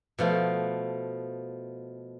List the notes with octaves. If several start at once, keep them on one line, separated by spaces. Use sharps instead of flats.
B2 F3 A3